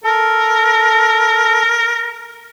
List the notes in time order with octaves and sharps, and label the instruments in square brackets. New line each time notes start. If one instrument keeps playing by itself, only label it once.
[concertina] A4 [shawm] A#4